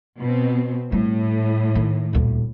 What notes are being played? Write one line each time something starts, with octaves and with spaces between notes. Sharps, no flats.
B2 C4
A2 G3
D#3
D#1 D2